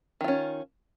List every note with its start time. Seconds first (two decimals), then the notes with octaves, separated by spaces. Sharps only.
0.21 D#3
0.24 F4
0.28 C#4